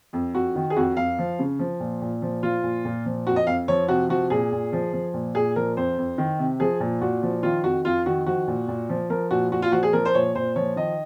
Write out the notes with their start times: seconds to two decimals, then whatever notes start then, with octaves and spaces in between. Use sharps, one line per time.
0.13 F2
0.34 F2 F#4
0.55 D#3
0.70 G#4
0.76 F2 F#4
0.97 F2 F5
1.18 F3
1.39 C#3
1.59 F3
1.80 A#2
2.02 A#2
2.22 F3
2.43 F3 F4
2.63 A#2
2.85 A#2
3.05 F3
3.27 F2 F#4
3.36 D#5
3.47 F2 F5
3.68 F3 C#5
3.88 C3 F#4
4.09 F3 F#4
4.30 A#2 G#4
4.52 A#2
4.72 F3
4.93 F3
5.14 A#2
5.35 A#2 G#4
5.56 F3 A#4
5.77 F2 C5
5.98 F2
6.18 D#3
6.39 C3
6.60 F3 G#4
6.80 A#2
7.01 A#2 F#4
7.23 F3
7.43 D#3 F4
7.64 F2 F#4
7.85 F2 F4
8.06 D#3 F#4
8.26 F3 F#4
8.48 A#2
8.68 A#2
8.89 F3
9.10 F3 A#4
9.31 A#2 F#4
9.52 A#2 F#4
9.62 F4
9.72 F3 F#4
9.83 G#4
9.93 F3 A#4
10.05 C5
10.15 A#2 C#5
10.35 A#2 C5
10.56 F3 C#5
10.76 D#3 D#5